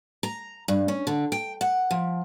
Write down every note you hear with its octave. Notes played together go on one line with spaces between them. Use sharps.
A#5
G2
C#4
D3
G5
F#5
F3